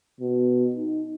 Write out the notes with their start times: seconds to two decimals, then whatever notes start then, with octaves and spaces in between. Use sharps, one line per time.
0.20 B2
0.76 D#4